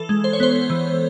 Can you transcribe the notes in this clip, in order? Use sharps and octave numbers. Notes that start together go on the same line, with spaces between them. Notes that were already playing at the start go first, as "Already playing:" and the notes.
Already playing: E3 A4
G#3
C5
C#5
B3 C5
E3